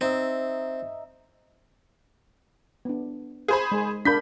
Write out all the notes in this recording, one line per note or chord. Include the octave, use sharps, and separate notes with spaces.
C4 D#4 E5
B3 D4
G#4 C5 B5
G#3
D4 G#4 A#4 B5 G6 B6